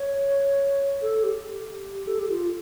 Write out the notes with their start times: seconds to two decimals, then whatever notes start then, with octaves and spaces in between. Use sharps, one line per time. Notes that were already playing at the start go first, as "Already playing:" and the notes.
Already playing: C#5
1.02 A4
1.23 G4
2.07 A4
2.19 G4
2.29 F4